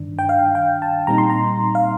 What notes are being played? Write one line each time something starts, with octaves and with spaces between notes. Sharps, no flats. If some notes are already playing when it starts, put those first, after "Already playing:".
Already playing: G2 D#3 D4
G5
F5
G5
A5
A#2 G3 C4 D#4 A#5
C6
A#5
F5